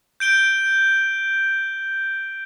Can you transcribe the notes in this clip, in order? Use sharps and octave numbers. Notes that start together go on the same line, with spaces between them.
G6 D7 G7